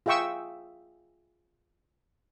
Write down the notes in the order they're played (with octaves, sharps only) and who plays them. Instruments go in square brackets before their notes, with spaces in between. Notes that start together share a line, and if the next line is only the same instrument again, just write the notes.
[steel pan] F4 G#4 E5 G5 C#6 E6